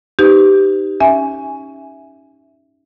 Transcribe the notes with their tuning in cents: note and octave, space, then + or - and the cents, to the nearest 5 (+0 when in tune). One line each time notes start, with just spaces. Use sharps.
D#4 +0 G4 +0 B4 +45
C#4 +0 E5 +0 G#5 +0